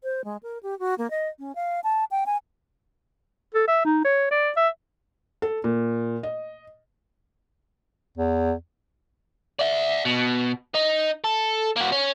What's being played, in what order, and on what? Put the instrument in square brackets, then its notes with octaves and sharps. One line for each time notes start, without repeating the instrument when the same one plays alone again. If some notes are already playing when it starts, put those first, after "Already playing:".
[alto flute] C5
G#3
A#4
G4
F#4
A#3
D#5
C#4
F5
A5
G5
G#5
[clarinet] A4
E5
D#4
C#5
D5
E5
[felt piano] A4
A#2
D#5
[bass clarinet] E2
[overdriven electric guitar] D5 E5
B2
D#4
A4
A#3 F#4
C#4